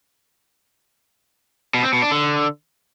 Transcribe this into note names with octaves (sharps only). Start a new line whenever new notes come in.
B2
C4
B2
D4
D3